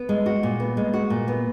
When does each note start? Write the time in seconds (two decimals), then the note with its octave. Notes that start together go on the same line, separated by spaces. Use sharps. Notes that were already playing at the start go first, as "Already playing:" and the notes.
Already playing: B3
0.09 G#3
0.26 F#4
0.43 A#2
0.60 B3
0.77 G#3
0.93 F#4
1.10 A#2
1.28 B3